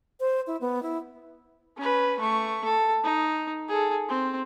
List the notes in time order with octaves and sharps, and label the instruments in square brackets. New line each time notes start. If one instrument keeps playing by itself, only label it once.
[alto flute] C5
E4
B3
E4
[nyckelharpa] C#4 B4
A3 C#6
A4
D#4
G#4 A4
C4